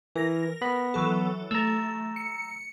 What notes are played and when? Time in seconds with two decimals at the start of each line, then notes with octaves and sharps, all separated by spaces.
0.16 E3 A#4 A#6
0.61 B3 B5
0.94 E3 F#3 A4
1.51 A3 A#5 E6
2.16 C#7